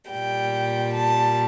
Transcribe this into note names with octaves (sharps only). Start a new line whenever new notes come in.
A#2 G3 G5
A5